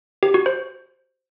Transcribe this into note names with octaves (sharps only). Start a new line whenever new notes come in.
G4
F#4
C5